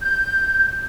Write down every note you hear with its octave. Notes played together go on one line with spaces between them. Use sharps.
G6